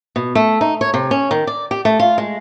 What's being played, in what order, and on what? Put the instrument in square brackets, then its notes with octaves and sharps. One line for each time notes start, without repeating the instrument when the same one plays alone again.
[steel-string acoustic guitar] B2
A3
D#4
C#5
C3
C#4
D#3
D5
G4
A3
F4
G#3